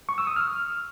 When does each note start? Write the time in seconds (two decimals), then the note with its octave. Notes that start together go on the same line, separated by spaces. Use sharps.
0.09 C#6
0.18 E6
0.27 D#6
0.36 F6